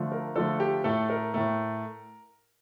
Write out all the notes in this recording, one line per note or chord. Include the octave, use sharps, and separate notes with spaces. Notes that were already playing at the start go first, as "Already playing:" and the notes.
Already playing: D3 F3 A3
A#4
D3 F3 A3 A4
G4
A2 A3 A4
A#4
A2 A3